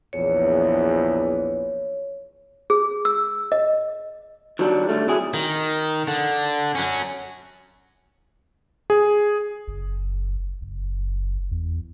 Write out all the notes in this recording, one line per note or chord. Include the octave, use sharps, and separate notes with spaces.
A#1 E2 C#5
G#4
E6
D#5
D#3 F#3 G3 D4
D3 G3 A3
C3 F#3 E4 G#4
D#3
D3
F#3 C#4
G#4
F#1
F#1
E2